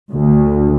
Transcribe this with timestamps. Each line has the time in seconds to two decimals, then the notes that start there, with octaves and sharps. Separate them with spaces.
0.10 D2